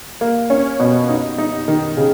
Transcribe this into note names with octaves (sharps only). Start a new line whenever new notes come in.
A#3
C#4
B2
D#4
D#4
D#3
C#3